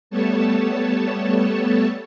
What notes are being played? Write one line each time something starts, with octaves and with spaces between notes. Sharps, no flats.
G3 A3 B3 A4 C#5 A5